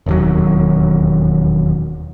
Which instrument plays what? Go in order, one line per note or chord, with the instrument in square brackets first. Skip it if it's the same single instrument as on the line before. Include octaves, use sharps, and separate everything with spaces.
[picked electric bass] E1 D#2 F#3